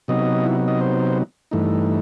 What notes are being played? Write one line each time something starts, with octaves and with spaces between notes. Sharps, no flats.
C3 F#3 B3 D#4 D#5
E4
D#5
C5
G2 E3 A3 D#4